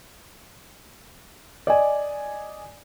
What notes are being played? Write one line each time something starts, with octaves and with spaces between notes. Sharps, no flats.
D5 D#5 G#5